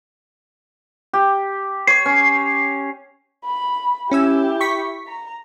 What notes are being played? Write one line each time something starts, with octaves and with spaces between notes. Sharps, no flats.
G4
C#5 C7
C#4
B5
C#4 E4 G4 G#5 E6
C#6 B6
A#5